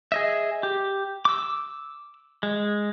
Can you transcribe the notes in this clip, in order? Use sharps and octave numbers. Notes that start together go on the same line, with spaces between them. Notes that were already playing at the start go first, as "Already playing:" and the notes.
G#4 D#5 E5
G4
D6 E6
G#3